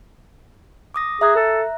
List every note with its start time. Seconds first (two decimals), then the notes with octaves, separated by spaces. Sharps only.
0.94 D6 D#6 A#6
1.21 G#4 E5 A#5 F#6
1.36 A4